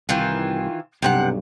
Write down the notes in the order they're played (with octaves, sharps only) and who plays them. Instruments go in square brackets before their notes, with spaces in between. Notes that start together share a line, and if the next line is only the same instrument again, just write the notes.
[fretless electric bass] C2 [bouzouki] D#3 E3 F4
[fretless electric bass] B1 G2 [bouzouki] C3 B4 F#5